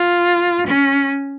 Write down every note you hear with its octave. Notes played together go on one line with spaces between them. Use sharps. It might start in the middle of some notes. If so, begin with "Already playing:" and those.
Already playing: F4
C#4